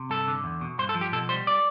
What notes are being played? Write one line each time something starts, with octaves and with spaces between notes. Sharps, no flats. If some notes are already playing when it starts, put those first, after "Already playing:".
Already playing: C3
G2 A4
D3
E2
B2
G2 C5
A4
F3
G4
B2 A4
G3 C5
D5